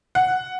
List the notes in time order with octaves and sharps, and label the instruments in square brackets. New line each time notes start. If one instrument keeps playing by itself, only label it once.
[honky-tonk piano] F#5